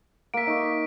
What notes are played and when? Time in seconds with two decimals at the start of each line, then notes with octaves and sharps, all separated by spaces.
0.34 A#3 E5 B6 D7
0.47 D#4 C#6